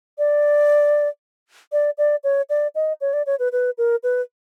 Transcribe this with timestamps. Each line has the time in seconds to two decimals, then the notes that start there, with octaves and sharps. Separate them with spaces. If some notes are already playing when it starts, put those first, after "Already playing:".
0.18 D5
1.72 D5
1.98 D5
2.24 C#5
2.49 D5
2.75 D#5
3.01 C#5
3.13 D5
3.26 C#5
3.39 B4
3.52 B4
3.78 A#4
4.03 B4